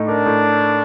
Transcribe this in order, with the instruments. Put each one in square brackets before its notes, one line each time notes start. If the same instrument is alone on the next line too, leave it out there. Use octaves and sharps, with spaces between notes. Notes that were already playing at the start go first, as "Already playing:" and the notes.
Already playing: [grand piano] A2 A3 D#4
[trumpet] D4 [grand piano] A#4
[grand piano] A2